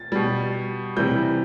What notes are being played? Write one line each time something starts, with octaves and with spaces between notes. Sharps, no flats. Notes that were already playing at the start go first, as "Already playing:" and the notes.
Already playing: A6
B2 G3
C3 E3 G3 G6